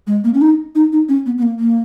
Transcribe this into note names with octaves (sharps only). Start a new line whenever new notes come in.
G#3
A#3
C#4
D#4
D#4
D#4
C#4
B3
B3
A#3
A#3